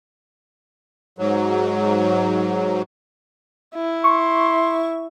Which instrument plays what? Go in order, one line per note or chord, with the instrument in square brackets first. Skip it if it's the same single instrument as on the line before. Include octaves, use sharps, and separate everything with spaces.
[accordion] G#2 F#3
[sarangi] E4
[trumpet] C6 [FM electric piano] C#6